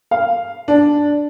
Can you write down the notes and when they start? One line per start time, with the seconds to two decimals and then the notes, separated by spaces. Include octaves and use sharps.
0.11 F5
0.68 D4